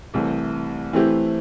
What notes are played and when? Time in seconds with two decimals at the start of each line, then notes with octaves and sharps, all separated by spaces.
0.14 C2 C3 E3 A3
0.93 E3 A3 C4 E4 G4